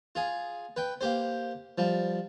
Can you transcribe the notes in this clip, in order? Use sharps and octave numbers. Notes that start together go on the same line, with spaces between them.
F4 G#4
B4 G5
A#3 G4 C5
F3 G3